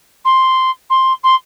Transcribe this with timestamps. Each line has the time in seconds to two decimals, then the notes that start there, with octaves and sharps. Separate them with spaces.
0.25 C6
0.90 C6
1.23 C6